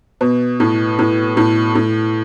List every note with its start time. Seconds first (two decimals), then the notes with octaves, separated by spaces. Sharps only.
0.21 B2
0.60 A2
0.99 A2
1.37 A2
1.75 A2